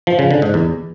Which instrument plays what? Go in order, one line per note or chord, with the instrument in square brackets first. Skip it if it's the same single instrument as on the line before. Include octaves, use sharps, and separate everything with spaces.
[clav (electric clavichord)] F3
C#3
D3
G#2
E2